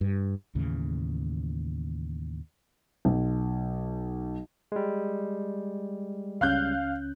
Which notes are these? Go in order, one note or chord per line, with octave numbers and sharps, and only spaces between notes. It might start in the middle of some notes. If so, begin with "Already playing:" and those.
G2
D#2 A2 C#3 E3
B1
G3 G#3
C#2 C#4 F5 F#6 G6